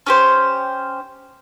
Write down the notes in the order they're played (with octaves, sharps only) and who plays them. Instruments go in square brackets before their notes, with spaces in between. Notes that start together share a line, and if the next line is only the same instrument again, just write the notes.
[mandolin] C#4 G4 C5